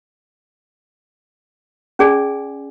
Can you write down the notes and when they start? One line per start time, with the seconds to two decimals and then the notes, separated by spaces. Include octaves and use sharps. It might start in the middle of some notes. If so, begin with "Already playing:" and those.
1.99 C#4 G#4 D5 G#5